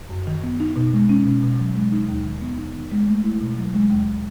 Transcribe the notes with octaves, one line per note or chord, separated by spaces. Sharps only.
F#2
D#3
B3
D#4
B2
G#3
C#4
B2
B2
F#3
G#3
D#4
D#2
D#3
B3
D#4
D#3
G#3
A3
E4
B2
F#3
G#3
D#2